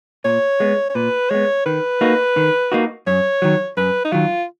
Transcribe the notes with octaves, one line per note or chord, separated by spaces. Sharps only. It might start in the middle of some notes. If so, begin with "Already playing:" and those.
A#2 C#5
G#3 B3
C#5
A#2 B4
G#3 B3 C#5
D#3 B4
A#3 D#4 F#4
D#3
A#3 D#4 F#4
F#2 C#5
D#3 F#3
F#2 B4
D#4
D#3 F#3 F4